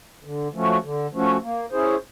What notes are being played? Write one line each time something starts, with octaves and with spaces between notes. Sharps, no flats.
D3
F3 A3 C#4 F#4
D3
F3 A3 C#4 F#4
A#3
C#4 E4 G#4 C5